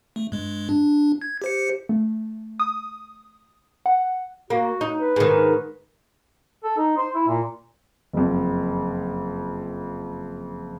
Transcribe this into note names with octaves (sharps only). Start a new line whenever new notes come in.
A3
G2 G#3
D4
G#6
G4 C5 C#7
A3
D#6
F#5
A#3 F#4
D#4
B4
G#2 D#3
A4
D#4
C5
E4
A#2
F#1 F2